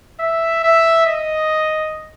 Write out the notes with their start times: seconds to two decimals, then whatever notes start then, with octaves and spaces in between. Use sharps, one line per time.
0.20 E5
0.64 E5
1.07 D#5